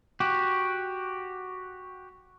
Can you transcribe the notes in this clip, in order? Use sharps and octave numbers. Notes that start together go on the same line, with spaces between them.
F#4 G4